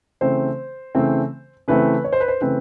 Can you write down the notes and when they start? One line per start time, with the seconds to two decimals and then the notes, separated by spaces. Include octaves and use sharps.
0.21 C#3 E3 A3 C4 C5
0.95 C#3 E3 A3 C4
1.68 C#3 E3 A3 C4 B4
2.04 C#5
2.13 C5
2.20 B4
2.28 C5
2.41 C#3 E3 A3 C4 B4